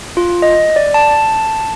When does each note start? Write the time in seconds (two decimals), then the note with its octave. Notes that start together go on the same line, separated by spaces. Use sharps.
0.17 F4
0.42 D#5
0.76 D5
0.94 A5